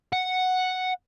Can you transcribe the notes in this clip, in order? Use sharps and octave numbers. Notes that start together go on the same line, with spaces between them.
F#5